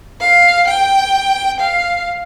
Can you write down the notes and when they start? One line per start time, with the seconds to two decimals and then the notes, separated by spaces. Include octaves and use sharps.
0.21 F5
0.68 G5
1.60 F5